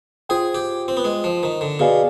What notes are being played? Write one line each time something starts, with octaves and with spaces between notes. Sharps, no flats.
F4 G#4 C5 G5
G4
C4
B3
G#3
F3
D#3
D3
B2 G#4 D5 F5 G#5